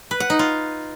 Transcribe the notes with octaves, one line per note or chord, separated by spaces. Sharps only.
B4
F#5
D#4
F4